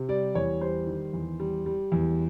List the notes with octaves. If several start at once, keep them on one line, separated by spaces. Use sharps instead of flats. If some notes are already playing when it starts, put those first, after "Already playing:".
Already playing: C3
G3 D5
E2 C#5
G3 C5
D#3
E2
G3
G3
E2